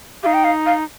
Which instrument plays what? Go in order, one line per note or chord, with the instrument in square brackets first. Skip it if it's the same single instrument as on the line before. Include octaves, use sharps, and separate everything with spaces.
[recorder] D#4 G4 [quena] F5
[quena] G5
F5
F5